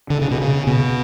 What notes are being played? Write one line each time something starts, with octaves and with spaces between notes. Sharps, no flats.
D3
C#3
B2
C#3
B2